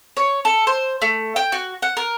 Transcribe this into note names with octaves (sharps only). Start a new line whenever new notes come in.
C#5
A4
C5
A3
G5
F#4
F#5
A#4